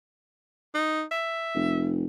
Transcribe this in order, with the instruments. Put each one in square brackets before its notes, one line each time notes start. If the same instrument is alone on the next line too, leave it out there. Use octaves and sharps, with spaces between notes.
[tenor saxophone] D#4
E5
[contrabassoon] F1